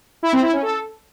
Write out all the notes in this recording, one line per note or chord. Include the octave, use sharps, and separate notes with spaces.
E4
C4
E4
C#4
A4